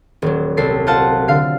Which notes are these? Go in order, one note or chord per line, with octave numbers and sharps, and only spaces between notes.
D#1 F#3
C2 A4 C7
F4 C5 F5 F#5 A5
D3 F5 C7